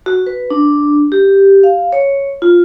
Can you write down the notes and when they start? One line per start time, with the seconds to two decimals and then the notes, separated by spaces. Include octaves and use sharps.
0.06 F#4
0.27 B4
0.50 D4
1.12 G4
1.63 F5
1.93 C#5
2.42 F4